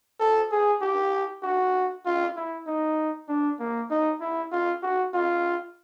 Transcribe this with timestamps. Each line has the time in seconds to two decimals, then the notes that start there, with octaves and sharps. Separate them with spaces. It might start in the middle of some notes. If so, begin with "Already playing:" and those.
0.20 A4
0.51 G#4
0.82 G4
1.43 F#4
2.06 F4
2.37 E4
2.67 D#4
3.29 D4
3.60 A#3
3.91 D#4
4.21 E4
4.52 F4
4.83 F#4
5.14 F4